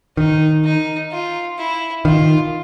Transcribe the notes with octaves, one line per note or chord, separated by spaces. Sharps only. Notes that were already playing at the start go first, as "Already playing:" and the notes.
D#3 D#4
D#4
F4
E4
D#3 F4